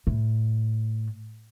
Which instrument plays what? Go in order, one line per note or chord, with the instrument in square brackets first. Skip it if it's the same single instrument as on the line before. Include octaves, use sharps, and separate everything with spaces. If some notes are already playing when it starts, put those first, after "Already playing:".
[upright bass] A2